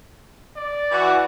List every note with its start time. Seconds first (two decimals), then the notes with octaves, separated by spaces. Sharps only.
0.56 D5
0.92 E3 F#4